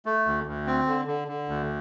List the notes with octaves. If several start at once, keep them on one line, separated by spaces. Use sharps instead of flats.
A3
D2
D2
C4
D3
D3
D3
D2